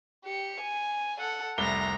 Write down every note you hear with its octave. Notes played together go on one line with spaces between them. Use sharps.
G4 C#7
G#5
A4 F#5
F1 C2 A#5 A#6 G7